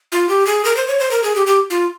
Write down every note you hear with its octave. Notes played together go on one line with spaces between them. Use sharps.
F4
G4
G#4
A#4
C5
C#5
C5
A#4
G#4
G4
G4
F4